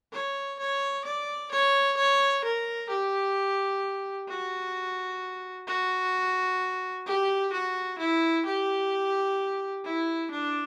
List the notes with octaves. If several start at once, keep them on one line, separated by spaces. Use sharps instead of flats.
C#5
C#5
D5
C#5
C#5
A#4
G4
F#4
F#4
G4
F#4
E4
G4
E4
D4